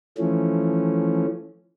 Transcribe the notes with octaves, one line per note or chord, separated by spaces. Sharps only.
E3 F3 A3 C#4